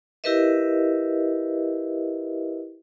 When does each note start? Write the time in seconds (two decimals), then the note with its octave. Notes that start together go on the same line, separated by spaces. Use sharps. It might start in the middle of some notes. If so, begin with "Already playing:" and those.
0.24 E4 G4 A#4 B4 D#5 E5